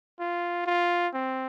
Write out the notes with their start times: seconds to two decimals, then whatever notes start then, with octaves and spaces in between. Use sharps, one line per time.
0.20 F4
0.66 F4
1.13 C4